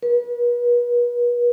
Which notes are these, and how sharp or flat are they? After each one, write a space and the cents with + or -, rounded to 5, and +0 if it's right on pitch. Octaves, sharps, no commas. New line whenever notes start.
B4 -40